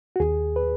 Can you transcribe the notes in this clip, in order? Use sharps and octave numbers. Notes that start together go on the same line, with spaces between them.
F#4
D#2 G#4
B4